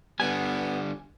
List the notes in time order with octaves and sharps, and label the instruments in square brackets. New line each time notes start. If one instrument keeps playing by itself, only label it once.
[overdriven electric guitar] D3 G3 [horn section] B3 [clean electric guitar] G#5